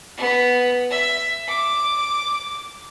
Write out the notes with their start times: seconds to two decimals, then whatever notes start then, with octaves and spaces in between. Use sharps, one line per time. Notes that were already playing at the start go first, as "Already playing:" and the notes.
0.17 B3
0.90 E5
1.48 D6